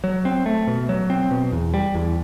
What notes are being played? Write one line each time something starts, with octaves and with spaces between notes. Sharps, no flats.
F#3
C4
A3
B2
F#3
C4
B2
E2
G3
E2